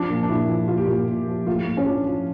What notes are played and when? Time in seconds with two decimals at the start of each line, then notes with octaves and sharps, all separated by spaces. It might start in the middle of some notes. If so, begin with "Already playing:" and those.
Already playing: F3 D4
0.09 A#2
0.23 D4
0.29 A#2 E4
0.48 F3
0.68 A#2 F4
0.77 G4
0.86 A#2 F4
1.08 A#2
1.28 F3
1.47 A2 F4
1.67 A2
1.77 C#4
1.86 F3 D4
2.06 F3